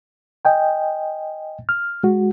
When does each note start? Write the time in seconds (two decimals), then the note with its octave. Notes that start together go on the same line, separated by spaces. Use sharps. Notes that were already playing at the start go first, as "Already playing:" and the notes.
0.45 D#5 G5 G#5
1.69 F6
2.03 G#3 F#4